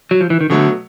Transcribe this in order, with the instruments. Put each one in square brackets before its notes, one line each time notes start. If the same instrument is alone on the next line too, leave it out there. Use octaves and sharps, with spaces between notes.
[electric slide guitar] F#3
F3
E3
D#3
[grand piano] B2 F#3 A3 [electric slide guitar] D3